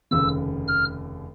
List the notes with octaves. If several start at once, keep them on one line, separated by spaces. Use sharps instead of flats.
F1 D#2 C#3 E6
F6